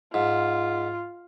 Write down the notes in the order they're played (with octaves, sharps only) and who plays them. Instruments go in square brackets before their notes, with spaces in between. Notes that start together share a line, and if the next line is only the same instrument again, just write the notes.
[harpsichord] G#2 [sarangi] F4